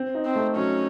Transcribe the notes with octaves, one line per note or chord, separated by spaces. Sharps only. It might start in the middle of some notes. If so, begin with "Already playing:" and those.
Already playing: C4
D#4
C4
A3
F#3 C#4